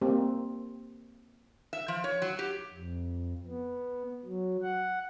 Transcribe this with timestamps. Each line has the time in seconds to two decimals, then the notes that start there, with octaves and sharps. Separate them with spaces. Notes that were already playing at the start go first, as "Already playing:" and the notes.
0.01 A#3 C4 G4
1.73 E5
1.88 F3
2.04 C#5
2.22 F#3
2.39 G4
2.73 F2
3.48 B3
4.25 F#3
4.63 F#5